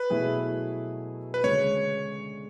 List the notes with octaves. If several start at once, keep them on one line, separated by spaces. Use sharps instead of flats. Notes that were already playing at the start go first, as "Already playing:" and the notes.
Already playing: B4
B2 F#3 A3 E4 G#4
B4
D2 C#3 G#3 C#5